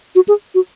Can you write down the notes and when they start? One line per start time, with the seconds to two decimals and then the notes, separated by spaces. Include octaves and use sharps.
0.15 F#4
0.28 G#4
0.55 F#4